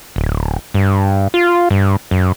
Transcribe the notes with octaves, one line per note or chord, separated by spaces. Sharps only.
D1
G2
F4
G2
F#2